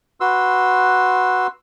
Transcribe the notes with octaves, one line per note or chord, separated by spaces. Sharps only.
F#4 B4 C6 E6